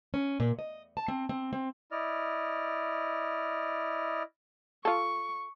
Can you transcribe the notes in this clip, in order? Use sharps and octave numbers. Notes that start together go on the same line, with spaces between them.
C#4
A#2
D#5
A5
C4
C4
C4
E4 D5 D#5 F6
F4 A4 C#6